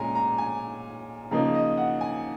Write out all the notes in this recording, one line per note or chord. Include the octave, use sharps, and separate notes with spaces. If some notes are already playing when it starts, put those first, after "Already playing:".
Already playing: A#2 G#3 C#4 G#5 A#5
A#5
G#5
C#3 F3 A#3 D#4 A#5
D#5
F#5
G#5